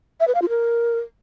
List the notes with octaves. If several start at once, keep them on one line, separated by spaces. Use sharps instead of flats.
E5
B4
F5
F4
A#4